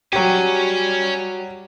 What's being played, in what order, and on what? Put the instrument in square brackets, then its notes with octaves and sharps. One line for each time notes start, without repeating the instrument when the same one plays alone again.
[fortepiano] F#3 G4 [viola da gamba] G3 [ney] F#4 [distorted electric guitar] C#5 G#5